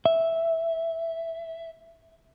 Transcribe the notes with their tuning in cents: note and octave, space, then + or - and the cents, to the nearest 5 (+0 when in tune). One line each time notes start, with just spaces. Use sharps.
E5 +0